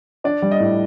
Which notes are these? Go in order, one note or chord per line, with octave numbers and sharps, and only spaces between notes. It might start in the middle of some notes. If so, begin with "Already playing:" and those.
D4 D5
G3
D#5
A2